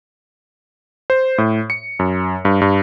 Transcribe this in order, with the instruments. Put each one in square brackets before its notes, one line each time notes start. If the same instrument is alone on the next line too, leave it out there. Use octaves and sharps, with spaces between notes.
[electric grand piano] C5
A2
C#7
F#2
G2
G2